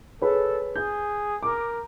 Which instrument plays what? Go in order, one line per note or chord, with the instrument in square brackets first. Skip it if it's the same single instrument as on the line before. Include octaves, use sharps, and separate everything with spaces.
[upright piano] G#4 B4 C#5 [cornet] A4
[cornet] G#4 [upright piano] G6
[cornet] A#4 [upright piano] D6